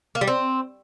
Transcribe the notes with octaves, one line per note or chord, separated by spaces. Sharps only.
A#3
G3
C4